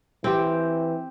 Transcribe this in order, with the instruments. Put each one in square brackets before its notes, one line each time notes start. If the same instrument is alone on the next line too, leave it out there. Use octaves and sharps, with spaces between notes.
[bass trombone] E3 [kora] C4 G4